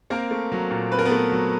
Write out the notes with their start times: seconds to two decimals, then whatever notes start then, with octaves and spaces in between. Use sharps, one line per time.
0.10 A#3 C4 A#4
0.31 A3
0.52 F#3
0.71 A#2
0.91 C4 B4
0.99 A#4
1.05 B3 B4
1.11 A3
1.32 F#3